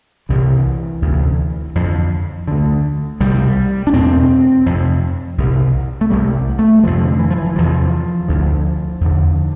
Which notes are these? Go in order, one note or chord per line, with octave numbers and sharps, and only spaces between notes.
C2 C3 E3
D2 C3
F2 D3
D2 D3
C2 B2 G3
D4
E2 B2 C4
F2 C3
C2 B2
A3
C2 C3 G3
A3
F2 C3 F3
D3
E3
F3
E3
E2 C3 F3
D2 D3
E2 D3